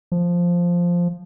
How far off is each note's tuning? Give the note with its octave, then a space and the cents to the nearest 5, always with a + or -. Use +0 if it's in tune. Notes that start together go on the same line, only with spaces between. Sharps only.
F3 +0